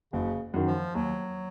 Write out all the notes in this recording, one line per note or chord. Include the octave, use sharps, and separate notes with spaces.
F#1 C#3
F#2 D#3
F3
D#2 F#3